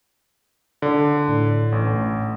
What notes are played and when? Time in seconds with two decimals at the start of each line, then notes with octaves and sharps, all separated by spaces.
0.82 D3
1.28 A2
1.72 A1